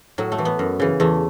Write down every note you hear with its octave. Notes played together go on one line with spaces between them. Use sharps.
A2 F#3
A3
E3
B3
F#2
C#3 E3
E2 A3